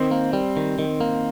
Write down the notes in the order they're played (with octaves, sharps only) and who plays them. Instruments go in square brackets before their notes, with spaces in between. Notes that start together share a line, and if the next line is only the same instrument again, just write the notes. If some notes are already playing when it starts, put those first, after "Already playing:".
Already playing: [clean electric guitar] D#3 [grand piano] C4
[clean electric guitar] A#3
G3
D#3
D#3
A#3